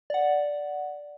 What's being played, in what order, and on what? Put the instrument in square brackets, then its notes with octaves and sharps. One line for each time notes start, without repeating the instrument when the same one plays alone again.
[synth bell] D5 F#5